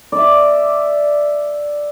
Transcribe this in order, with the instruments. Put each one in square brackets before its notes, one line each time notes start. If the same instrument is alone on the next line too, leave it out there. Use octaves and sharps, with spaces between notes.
[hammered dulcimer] D5 E5